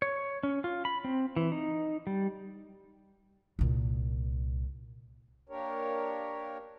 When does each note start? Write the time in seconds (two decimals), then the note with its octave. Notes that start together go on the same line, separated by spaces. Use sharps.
0.02 C#5
0.43 C#4
0.64 F4
0.85 B5
1.05 C4
1.36 E3
1.52 D#4
2.07 G3
3.59 C2 A#2
5.49 A#3 D4 G4 A#4 C#5